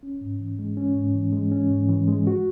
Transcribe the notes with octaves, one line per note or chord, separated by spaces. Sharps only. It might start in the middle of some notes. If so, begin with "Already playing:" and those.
C#4
G#2
E3
G#3
C#4
G#2
E3
G#3
C#4
G#2
E3
G#3
F#4